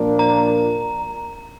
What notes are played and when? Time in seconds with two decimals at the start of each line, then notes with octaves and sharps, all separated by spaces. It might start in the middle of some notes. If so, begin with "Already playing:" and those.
Already playing: A#2 F3 D4 A#4
0.19 A#5